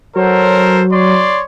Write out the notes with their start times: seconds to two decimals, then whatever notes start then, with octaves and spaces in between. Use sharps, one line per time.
0.16 F#3 A4 A#4 C5
0.92 C#5 D5 C6